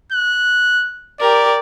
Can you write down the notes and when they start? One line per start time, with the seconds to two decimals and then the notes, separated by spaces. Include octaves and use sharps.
0.12 F#6
1.20 G4 A#4 D5